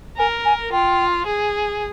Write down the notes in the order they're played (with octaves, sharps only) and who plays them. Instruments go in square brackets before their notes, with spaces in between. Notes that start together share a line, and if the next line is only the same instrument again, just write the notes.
[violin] A#4 [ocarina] G#5
[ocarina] G#5
[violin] F4 [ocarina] G5
[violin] G#4